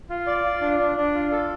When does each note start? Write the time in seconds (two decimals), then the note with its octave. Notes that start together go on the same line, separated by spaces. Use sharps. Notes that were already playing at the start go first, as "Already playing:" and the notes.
0.10 F4
0.27 D5
0.44 F4
0.61 D4
0.79 D4
0.96 D4
1.15 F4
1.32 A4